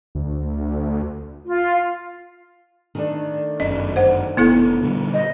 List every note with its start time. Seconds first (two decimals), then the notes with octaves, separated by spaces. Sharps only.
0.15 D2
1.45 F4
2.95 D#3 A3 D4
3.60 G1 F#2 C#4 D#5
3.96 C5 F#5
4.37 F1 B2 B3 E4 A4
4.83 A#2 D3 G3
5.13 D#5